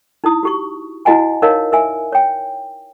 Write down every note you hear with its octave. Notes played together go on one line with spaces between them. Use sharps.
D#4 E4 D#6
F#4 G4 C#6
E4 F#4 D#5 F#5 G#5 A5
D#4 A#4 C#5 D#5 F5
A#4 E5 G#5
C#5 G5